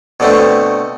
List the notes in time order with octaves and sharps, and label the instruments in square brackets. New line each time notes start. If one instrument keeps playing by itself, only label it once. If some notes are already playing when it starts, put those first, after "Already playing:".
[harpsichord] B2 D3 A3 C4